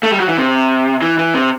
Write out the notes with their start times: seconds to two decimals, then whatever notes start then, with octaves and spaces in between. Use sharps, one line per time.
0.03 A3
0.11 G3
0.20 F#3
0.29 E3
0.37 C3
1.02 E3
1.18 E3
1.34 C3